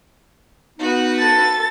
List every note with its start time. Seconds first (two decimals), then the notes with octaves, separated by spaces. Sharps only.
0.79 B3 D#4 F#4 B4
1.19 A4 A6